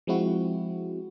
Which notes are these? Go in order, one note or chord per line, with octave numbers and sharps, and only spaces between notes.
F3 G#3 C4 E4 F#4